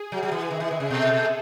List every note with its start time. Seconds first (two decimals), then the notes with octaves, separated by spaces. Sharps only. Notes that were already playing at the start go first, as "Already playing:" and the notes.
Already playing: G#4
0.12 F#3
0.23 F#3
0.32 E3
0.51 D#3 G#4
0.60 E3
0.71 D#3
0.80 C#3
0.90 B2 A4